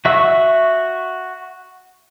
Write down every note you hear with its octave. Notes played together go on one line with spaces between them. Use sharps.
F#4 E5 C#6 E6